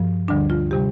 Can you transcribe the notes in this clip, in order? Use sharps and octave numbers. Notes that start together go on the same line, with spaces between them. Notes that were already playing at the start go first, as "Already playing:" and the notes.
Already playing: G2 F3
D2 D3 G3 D4
F4
C3 G3 G4